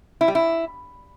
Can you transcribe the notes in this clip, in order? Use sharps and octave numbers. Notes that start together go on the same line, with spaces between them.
E4
G3
E4